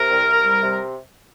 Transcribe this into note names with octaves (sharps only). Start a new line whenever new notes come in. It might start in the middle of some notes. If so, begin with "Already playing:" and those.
Already playing: C3 A#4
C2
C2
G3
C3